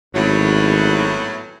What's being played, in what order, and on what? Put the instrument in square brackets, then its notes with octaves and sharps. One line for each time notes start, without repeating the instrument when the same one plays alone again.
[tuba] G#1 [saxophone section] E2 A2 F#3